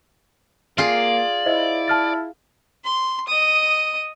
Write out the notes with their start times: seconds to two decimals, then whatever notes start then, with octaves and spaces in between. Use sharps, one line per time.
0.78 A#3 F4 G#4 D5
1.46 E4 C5 D#5
1.88 A5 F6 A6
2.84 C6
3.28 D#5 D#6